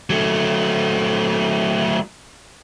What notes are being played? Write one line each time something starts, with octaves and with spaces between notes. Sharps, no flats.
F#3 A3